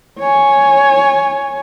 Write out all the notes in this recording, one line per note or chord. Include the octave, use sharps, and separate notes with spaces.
C#5 G#5